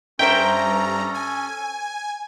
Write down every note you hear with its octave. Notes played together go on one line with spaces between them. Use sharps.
G2 C#4 A4 C5 E5 G5 A#5
G#5